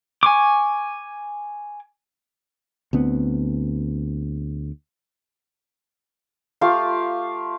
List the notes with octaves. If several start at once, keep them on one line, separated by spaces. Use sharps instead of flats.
G#5 C#6 D6
D2 B3 C4
A3 F4 G4 F5